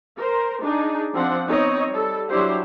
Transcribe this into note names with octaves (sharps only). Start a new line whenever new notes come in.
A#4 C5
D4 D#4 G#4
F3 C4 D4 F#5
B3 C4 D#4 C#5 D#5
G3 A4
F#3 D4 E4 G4 C5